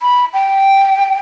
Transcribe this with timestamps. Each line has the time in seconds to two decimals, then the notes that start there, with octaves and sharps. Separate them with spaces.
0.02 B5
0.34 G5